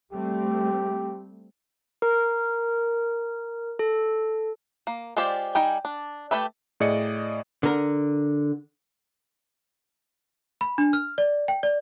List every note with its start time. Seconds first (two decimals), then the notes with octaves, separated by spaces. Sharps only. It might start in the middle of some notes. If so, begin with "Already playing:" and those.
0.13 G3 A3 C4 G4
2.02 A#4
3.79 A4
4.87 A#3
5.17 G#3 F4 G4 C5 D5
5.55 G3 D#4 G5 G#5
5.85 D4
6.31 A3 G4 B4 E5
6.80 A2 G#4 D5 D#5 C#7
7.63 D3 A#4
10.61 B5
10.78 D4
10.93 F6
11.18 D5
11.48 G5
11.63 D5